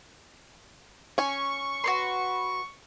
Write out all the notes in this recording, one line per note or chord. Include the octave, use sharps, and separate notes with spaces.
C#4 G#5 C#6
F#4 B4 C6